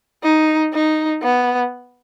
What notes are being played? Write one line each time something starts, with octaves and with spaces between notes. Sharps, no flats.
D#4
D#4
B3